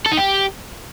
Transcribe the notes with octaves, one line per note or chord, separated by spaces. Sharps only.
A4
D#4
G4